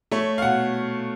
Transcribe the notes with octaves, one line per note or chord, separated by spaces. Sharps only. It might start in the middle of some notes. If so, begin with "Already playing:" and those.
A3 C#5
F5
B2 F#5